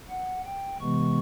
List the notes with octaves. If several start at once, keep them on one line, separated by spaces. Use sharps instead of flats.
F#5
G5
C3 E3 G#3 B3 C#6